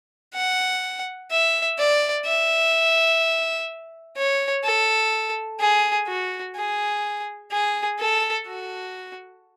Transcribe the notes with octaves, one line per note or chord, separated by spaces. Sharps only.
F#5
E5
D5
E5
C#5
A4
G#4
F#4
G#4
G#4
A4
F#4